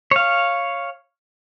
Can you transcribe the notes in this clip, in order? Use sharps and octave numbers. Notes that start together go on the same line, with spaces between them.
C#5 F5